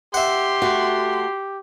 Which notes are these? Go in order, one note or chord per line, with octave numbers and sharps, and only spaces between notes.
G4 E5 F#5 C6
A3 F#4